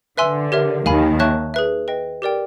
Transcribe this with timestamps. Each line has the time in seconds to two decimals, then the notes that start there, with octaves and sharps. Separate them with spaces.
0.17 D3 B4 E5 G#5 C6 E6
0.52 G4 A#4 C#5 E5
0.86 D#2 D#3 F5 G#5 B5
1.19 C#5 E5 A5 C#6 F#6
1.54 G#4 B4 E5
1.88 B4 D#5 G5
2.22 G4 A#4 D5 G5